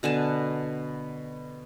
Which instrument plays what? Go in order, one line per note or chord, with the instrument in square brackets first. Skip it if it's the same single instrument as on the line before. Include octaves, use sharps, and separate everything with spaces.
[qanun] B2 D3 G#5 A5